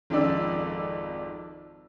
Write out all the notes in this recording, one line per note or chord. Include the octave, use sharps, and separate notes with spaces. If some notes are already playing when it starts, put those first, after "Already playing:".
G#1 F2 D#4 D5 E6